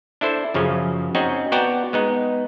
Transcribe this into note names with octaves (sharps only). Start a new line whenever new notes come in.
D4 E4 A4 C5
F#2 C#3 F3 C#4
C4 C#4 D#4 F#4 D#5
B3 F#4 D5 G5 A5 A#5
G#3 B3 D#4